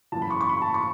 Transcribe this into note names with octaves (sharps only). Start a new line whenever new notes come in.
F#1 F#2 E3 A5
B5
C#6
C#6
B5
A5
C#6